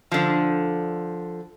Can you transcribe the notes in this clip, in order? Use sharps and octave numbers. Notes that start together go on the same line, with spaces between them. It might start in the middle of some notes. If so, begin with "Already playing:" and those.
D3 F3